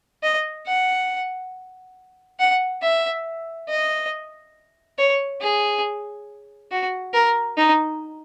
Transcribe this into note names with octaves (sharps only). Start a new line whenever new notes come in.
D#5
F#5
F#5
E5
D#5
C#5
G#4
F#4
A#4
D#4